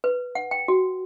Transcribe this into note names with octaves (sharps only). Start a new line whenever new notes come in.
B4
F#5
G5
F#4